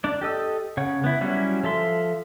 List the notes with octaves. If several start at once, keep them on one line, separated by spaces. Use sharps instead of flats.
D4 D5
G4 A4 D#5 E6
C#3 C#5 F#5
B3 E4
F#3 G3 C#4 E4 F#4
F3 A4 E5 C6